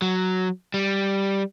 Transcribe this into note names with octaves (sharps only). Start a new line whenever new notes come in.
F#3
G3